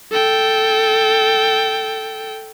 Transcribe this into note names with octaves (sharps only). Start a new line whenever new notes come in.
A4 G5